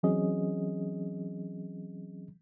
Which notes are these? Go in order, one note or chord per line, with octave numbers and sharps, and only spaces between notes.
E3 F#3 C4 C#4 G#4 D#5